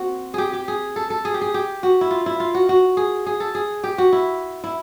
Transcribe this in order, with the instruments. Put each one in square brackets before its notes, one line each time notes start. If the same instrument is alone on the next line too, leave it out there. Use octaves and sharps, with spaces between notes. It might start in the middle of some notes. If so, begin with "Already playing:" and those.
Already playing: [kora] A#3 C4 F#4
G4 G#4
G4
G#4
A4
A4
G#4
G4
G#4
G4
F#4
E4
F4
E4
F4
F#4
F#4
G#4
G#4
A4
G#4
G4
F#4
E4
E4